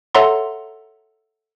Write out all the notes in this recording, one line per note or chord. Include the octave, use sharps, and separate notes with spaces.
A4 C#5 E5 F#5 A#5 C6